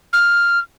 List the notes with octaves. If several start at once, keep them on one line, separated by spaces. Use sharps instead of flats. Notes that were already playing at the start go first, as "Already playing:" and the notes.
F6